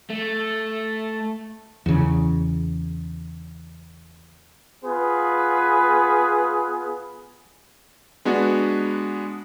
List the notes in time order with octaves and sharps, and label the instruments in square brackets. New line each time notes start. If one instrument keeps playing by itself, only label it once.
[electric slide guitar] A3
[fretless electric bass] E2 C#3
[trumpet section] B3 F4 G#4 B4
[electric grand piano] G#3 B3 D4 F#4